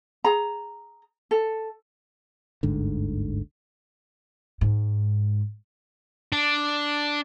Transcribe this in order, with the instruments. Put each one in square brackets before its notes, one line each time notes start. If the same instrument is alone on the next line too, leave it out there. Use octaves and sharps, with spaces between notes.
[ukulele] G#4 A#5
A4
[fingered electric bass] G1 D2 G#2 D3
[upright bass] G#2
[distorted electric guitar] D4